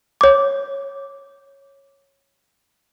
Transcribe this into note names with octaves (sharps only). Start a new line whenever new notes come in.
C#5 D6